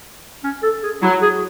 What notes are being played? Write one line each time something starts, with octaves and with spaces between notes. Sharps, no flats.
C#4
A4
G#4
F#3 E4
G#4